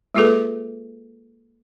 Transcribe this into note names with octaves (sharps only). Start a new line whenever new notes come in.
G#3 A#3 F4 G#4 A4 B4